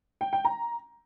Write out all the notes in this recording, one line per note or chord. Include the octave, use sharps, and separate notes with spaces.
G5
G5
A#5